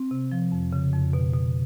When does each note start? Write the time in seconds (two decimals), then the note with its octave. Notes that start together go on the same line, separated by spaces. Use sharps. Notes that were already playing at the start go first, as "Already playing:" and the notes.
Already playing: C4
0.11 C3
0.31 F3
0.52 F2
0.73 C#3
0.93 F2
1.13 B2
1.34 B2